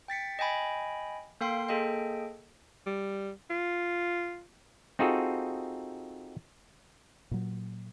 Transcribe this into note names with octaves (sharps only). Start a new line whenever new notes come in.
G5 A6 B6 C#7
D#5 G5 G#5 B5
A#3 A4 F5 G5 C6 C7
A#3 G#4 A4 D#5 G5
G3
F4
C4 D#4 F4 F#4 G#4 A4
A#2 F#3